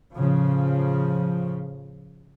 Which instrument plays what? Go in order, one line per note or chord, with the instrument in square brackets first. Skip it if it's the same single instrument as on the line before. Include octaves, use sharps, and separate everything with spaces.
[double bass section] A2 C#3 F3